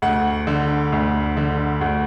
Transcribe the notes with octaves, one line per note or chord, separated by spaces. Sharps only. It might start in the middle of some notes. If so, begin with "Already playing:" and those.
D2 F#5
D3
D2
D3
D2 F#5